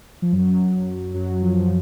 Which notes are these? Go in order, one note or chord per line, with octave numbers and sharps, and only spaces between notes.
F3
F#2 F#3
F#2 F#3
F3